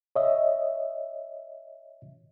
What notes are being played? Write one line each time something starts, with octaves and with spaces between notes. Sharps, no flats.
C#5 D#5 E5